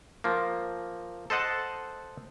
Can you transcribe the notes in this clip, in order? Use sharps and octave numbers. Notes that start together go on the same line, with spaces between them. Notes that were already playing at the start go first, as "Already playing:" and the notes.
F3 A#3
A4 C5 D#5 F#5 A5